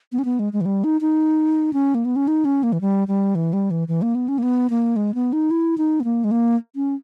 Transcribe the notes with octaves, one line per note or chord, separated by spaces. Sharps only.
B3
C#4
B3
G#3
G#3
E3
G3
D#4
D#4
C#4
A#3
B3
C#4
D#4
C#4
A#3
E3
G3
G3
E3
G3
E3
E3
A#3
B3
C#4
A#3
B3
A#3
G#3
B3
D#4
E4
D#4
B3
A#3
G#3
A#3
C#4